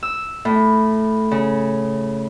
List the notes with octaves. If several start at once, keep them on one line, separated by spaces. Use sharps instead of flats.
E6
A2
C#3